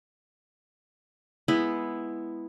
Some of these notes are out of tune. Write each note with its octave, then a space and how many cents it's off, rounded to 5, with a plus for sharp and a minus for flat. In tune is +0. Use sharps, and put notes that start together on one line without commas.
G#3 +0 B3 +0 E4 +0